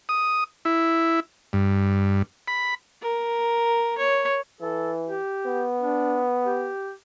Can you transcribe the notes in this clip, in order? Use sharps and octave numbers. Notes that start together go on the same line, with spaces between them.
D#6
E4
G2
B5
A#4
C#5
E3 A4
G4
B3
D4
G4